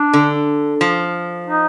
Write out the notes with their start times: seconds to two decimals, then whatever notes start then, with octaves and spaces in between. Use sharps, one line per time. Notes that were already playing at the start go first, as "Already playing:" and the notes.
Already playing: D4
0.13 D3
0.81 F3
1.47 D#4